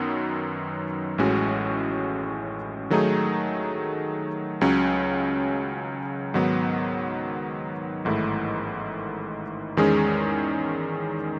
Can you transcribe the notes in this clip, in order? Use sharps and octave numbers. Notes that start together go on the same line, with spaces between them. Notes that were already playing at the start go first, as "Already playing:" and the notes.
Already playing: F#2 D#3 F#3 B3
A1 A2 G#3 C#4 F#4
D#3 F#3 A3 D#4 G#4
C#2 C#3 F#3 C#4
G#2 D#3 F#3 B3
A1 G#2 D#3 A3 E4
E2 D#3 G#3 C#4 G#4